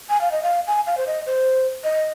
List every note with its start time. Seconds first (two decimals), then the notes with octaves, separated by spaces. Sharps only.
0.10 G#5
0.21 F5
0.32 D#5
0.43 F5
0.67 G#5
0.87 F5
0.98 C5
1.07 D#5
1.26 C5
1.84 D#5